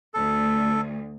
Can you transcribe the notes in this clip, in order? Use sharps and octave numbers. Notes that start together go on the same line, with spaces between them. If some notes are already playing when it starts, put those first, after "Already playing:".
D2 A4